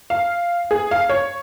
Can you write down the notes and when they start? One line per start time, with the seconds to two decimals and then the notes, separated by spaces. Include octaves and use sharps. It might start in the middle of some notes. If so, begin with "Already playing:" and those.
0.10 F5
0.71 G#4
0.91 F5
1.10 C#5